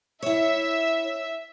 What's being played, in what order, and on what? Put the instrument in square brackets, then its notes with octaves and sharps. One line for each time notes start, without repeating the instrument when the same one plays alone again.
[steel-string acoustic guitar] E4 C#5 [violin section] E5